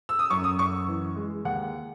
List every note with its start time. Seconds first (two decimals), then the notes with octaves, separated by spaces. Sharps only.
0.09 E6
0.19 D#6
0.30 F#2 C#6
0.44 D#6
0.59 F#2 C#6
0.88 E3
1.16 G#3
1.45 D#2 F#5